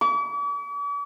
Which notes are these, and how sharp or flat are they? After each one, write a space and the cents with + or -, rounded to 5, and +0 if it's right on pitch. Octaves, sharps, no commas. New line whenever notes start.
D6 -45